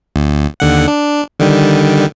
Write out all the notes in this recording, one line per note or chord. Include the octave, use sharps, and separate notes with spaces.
D2
D#2 D3 F#5
D4
D3 D#3 G3